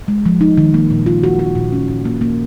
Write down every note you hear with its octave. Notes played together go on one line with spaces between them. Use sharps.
G#3
F3
D#4
D#3
A#3
A#2
F4
F#4
F#4
A#2
C#4
A#2
A#3
A#3